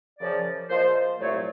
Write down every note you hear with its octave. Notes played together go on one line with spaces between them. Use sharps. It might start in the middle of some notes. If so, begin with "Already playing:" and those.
F#2 C#3 F3 D5
A#2 F3 G#3 C5
C2 A#2 F#3 A3 C#5